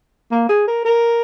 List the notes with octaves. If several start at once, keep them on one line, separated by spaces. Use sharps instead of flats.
A#3
G#4
A#4
A#4